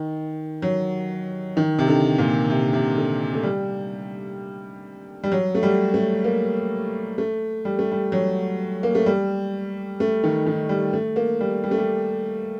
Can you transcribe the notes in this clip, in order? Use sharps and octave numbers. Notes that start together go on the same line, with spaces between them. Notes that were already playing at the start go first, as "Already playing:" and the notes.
Already playing: D#3
F#3
D#3
C3
D3
A#2
C3
C3
D3
A3
G3
G3
F#3
A3
G3
A3
A#3
A3
G3
A3
G3
F#3
A#3
A3
G3
A3
D#3
D#3
G3
A3
A#3
G3
G3
A3
G3